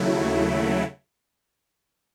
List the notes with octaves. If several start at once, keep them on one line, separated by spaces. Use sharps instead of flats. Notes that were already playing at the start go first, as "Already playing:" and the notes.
Already playing: D#2 C#3 F#3 A3 E4